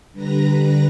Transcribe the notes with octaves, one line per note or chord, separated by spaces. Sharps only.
D3 G3 B4 A#5 A#6